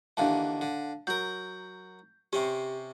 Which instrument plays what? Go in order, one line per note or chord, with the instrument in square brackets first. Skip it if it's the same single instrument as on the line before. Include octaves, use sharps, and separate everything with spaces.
[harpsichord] D#2 D3 E3 [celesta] D4 F5 A5
[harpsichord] D3
[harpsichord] F#3 A#4 [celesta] G6
[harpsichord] C3 C4 C#4 [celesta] G4